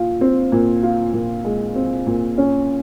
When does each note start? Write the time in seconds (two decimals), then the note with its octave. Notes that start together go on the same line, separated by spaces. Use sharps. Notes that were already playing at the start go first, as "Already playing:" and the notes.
Already playing: A#2 F4
0.21 C4
0.52 A#2
0.83 F4
1.13 A#2
1.44 G#3
1.75 C4
2.07 A#2
2.38 C#4